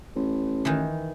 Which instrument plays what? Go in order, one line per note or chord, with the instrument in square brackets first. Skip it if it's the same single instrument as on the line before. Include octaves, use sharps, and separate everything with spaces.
[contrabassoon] A1
[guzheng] D#3 E3